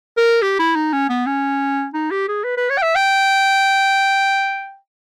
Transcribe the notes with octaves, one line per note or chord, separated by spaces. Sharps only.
A#4
G4
E4
D#4
C#4
B3
C#4
D#4
G4
G#4
B4
B4
C#5
G5
E5
G5